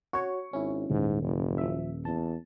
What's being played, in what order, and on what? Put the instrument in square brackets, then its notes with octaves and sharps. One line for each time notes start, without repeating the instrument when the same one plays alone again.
[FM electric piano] F#4 C#5 [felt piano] C#6
[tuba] G#1 [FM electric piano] C#4 E4
[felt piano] D#1 [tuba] G#2
[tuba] F#1
[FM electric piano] F3 E5
[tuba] E2 [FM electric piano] A5